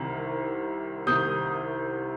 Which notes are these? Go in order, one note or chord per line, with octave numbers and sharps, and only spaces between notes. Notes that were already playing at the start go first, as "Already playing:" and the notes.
Already playing: C2 C3 D#3
C2 C3 D#3 D#6 G6